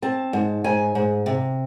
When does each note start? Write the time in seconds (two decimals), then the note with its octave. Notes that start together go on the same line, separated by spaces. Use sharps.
0.02 C4 A5
0.33 G#2
0.64 G#2 G#5
0.95 G#2
1.26 C3